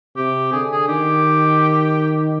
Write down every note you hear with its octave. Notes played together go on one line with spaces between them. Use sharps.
C3 G4
D3 G#4
G#4
D#3 G4